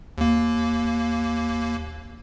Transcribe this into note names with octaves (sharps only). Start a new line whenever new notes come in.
D#2 A#3